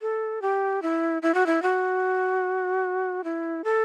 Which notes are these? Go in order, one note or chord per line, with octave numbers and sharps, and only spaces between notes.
A4
G4
E4
E4
F#4
E4
F#4
E4
A4